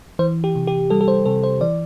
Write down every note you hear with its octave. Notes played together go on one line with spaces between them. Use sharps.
E3 C5
G4
C3
G4
G3 A4
A4
C5
C3 A4
C5
E3 D5